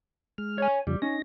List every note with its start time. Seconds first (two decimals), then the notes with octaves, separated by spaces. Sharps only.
0.38 G#3 F6
0.58 C#5 G#5
0.87 F2 C#3 F3 G3
1.02 C#4 D#4 A#6